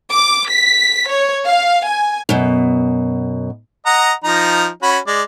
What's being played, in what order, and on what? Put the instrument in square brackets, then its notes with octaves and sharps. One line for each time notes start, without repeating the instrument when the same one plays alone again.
[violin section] D6
B6
C#5
F5
G#5
[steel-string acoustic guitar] F#2 B2
[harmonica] D#5 F#5 A#5
F3 D#4 A#5
C#4 F#4 B5
G#3 D5